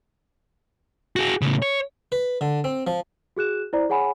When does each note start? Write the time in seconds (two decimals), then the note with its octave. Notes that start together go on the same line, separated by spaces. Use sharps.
1.16 F#4 G#4
1.42 A2 C#3
1.62 C#5
2.12 B4
2.41 D3
2.64 C4
2.87 F3
3.37 F#4 G#4 F#6 E7
3.73 E4 C5 D5 A#5
3.89 G#4 C#5 F#5 G#5 B5